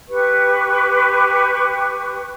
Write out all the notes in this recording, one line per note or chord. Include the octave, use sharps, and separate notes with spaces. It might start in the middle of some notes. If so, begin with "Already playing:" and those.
G4 B4 C#6